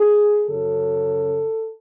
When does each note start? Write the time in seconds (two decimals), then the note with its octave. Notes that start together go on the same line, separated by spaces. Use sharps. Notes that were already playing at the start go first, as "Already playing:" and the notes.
Already playing: G#4
0.47 F#2 C#3 F#3 A4